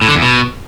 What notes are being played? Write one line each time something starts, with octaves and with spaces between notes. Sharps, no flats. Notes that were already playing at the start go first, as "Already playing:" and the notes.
A2
D3
E2
B2